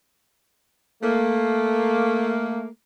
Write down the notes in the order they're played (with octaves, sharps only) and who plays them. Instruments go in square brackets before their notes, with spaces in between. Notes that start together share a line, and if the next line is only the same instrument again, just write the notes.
[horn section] A3 A#3